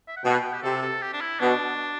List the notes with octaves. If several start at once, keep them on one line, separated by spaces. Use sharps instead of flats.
E5
F#5
B2 G5
G4
C3 A4
A4
G4
D4
E4
B2 D4